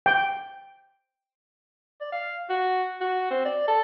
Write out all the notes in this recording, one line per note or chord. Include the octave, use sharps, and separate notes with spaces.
G5
D5
F5
F#4
F#4
C4
D5
A4